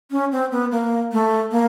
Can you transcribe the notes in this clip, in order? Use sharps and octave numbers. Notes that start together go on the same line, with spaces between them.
C#4
C4
B3
A#3
A3
A#3